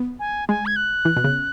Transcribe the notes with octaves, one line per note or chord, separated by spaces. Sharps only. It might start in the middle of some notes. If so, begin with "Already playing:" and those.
Already playing: B3
G#5
G#3 G#5
G#6
F#6
E3
B2
C#3